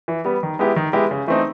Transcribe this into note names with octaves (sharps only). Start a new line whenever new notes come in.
E3
G3 B3
D#3
G#3 B3 E4 G4
D#3
G#3 B3 E4 G4
C#3
E3 A3 C4 D#4